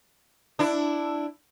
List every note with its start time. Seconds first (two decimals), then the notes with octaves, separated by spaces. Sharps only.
0.59 D4 E4